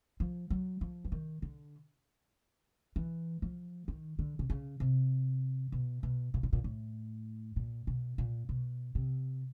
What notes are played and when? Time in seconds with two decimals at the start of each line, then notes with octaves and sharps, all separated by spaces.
0.20 F3
0.50 F#3
0.81 F3
1.05 E3
1.12 D#3
1.42 D3
2.96 E3
3.42 F3
3.88 D#3
4.19 D3
4.39 C3
4.50 C#3
4.80 C3
5.72 B2
6.03 B2
6.34 A#2
6.43 A2
6.53 A#2
6.64 A2
7.56 A#2
7.87 B2
8.18 A#2
8.49 B2
8.95 C3